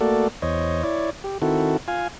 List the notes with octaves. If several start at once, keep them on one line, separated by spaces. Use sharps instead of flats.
A3 A#3 F#4 A4 D5
E2 C5 C#5 D#5
E4 C#5 D5
G4
D#3 C4 E4 F#4 A4
F4 F5 G#5